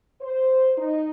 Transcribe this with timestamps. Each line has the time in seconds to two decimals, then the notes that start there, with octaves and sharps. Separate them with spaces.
0.22 C5
0.77 D#4